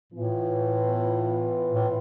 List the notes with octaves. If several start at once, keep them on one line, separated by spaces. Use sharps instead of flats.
A2 E3 B3 F4
A2